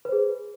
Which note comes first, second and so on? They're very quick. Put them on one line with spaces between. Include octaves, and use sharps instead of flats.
B4 C5 G#4